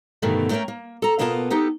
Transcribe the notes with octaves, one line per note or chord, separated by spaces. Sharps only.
G2 B2 D3 D#3 A3
A3 A#3 C#4 A#4 G5
A#3
A4 A#5
B2 A#3 B3 E4 F4 A5
B3 D#4 G4 A4